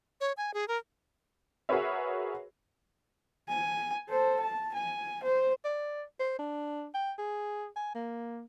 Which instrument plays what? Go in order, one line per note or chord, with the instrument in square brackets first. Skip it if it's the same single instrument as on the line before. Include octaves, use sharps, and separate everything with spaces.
[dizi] C#5
G#5
G#4
A#4
[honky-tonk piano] F#4 G#4 A#4 B4 C#5 E5
[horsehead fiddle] G#5
A4 C5
A5
G#5
C5
[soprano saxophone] D5
C5
D4
G5
G#4
G#5
A#3